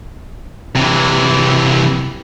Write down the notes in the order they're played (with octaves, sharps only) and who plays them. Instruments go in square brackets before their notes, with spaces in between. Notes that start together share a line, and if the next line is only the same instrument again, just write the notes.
[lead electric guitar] C3 E3